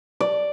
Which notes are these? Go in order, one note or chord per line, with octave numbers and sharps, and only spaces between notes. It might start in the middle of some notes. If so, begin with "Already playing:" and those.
D5